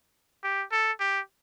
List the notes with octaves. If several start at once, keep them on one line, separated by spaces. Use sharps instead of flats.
G4
A4
G4